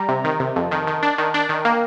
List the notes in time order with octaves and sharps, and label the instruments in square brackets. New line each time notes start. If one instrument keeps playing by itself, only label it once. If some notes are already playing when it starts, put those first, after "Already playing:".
Already playing: [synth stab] G3 [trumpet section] A#5
[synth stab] C3
D#3
C3
[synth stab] F2 [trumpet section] A5
[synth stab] D#3
D#3
D4
D#3
D4
[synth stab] D#3 [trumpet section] G5
[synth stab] A#3